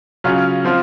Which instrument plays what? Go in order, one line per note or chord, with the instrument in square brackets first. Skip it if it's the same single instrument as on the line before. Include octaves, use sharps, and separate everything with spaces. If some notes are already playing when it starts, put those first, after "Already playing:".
[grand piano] C#3 F#3 C#4 F4
F3 C4 F4